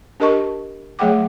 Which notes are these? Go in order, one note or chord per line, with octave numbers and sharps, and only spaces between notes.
D4 G4 A#4 D#5 A5 C#6
F#3 A3 G#4 F#5 G5 D6